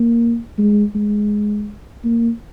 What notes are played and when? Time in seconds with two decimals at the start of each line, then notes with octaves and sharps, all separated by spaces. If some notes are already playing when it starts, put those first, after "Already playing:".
Already playing: A#3
0.58 G#3
0.95 G#3
2.04 A#3